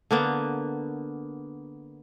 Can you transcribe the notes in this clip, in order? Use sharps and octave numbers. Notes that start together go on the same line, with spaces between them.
D3 A#3 B3